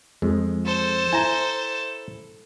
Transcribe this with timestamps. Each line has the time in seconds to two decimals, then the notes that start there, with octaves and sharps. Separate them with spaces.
0.22 F2 G#3
0.65 A4 C5
1.13 E4 G#5 A#5